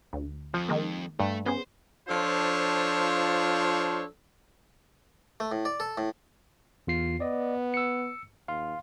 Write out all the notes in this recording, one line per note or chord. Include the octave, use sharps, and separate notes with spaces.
D2
F2 F3
D#3 G#3 A#3
G2 A3
B3 C#4 G#4 C5
F3 D4 F4 A4 C5 C#5
A3
A2
D5
A4
A2
E2 F4 C7
B3 D5 D#5
E6 C#7
D#2 F5 C6